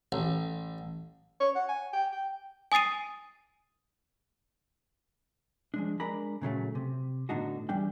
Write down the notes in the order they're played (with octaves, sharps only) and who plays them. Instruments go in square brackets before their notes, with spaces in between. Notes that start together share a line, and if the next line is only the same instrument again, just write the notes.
[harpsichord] A1
[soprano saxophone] C#5
F#5
G#5
G5
G5
[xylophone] G#5 D#6 A6 C7 D#7
[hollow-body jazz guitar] F3 G#3 D4
G#3 D4 A#4 A#5 B5
A#2 C#3 F#3 A3
C3
A2 D3 B3 D4 D#4 F#4
E2 E3 G3 D4 G5